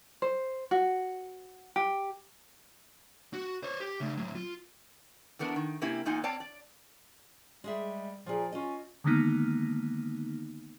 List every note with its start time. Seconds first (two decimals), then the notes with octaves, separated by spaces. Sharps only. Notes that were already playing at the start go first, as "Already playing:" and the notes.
0.22 C5
0.71 F#4
1.76 G4
3.33 F#4
3.63 C5 C#5
3.80 G4
4.00 C#3 A3
4.17 A2 F#3
4.35 F4
5.39 E3 A3 B3 D4 A#4
5.56 D#3
5.82 C3 A#3 C#4 E4 G4
6.05 E2 A#2 D#4 F5 G#5
6.24 C4 C#5 D5 F5 A5
6.40 D5
7.64 G3 G#3 G#4 E5
8.26 A#2 F3 G#4
8.52 C#4 F4 D#5
9.04 D3 D#3 G#3 A#3 B3 D#4